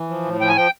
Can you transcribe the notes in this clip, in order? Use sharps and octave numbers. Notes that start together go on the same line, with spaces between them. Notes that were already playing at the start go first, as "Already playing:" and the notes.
Already playing: E3
F3
A2
F3 G5
G#5
F3 G5